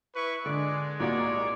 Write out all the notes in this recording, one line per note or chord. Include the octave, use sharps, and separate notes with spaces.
E4 B4 C#6
D3 G#3 D5
C2 A#2 F#4 C#5 D5